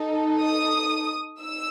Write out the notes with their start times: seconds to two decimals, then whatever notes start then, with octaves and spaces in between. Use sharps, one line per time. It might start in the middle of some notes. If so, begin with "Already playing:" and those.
Already playing: D#4 A4
0.43 D#6
1.40 D#4 E6